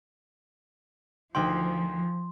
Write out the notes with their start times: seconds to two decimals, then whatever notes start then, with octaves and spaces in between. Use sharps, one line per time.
1.35 D2 D#3 F3 G5 C6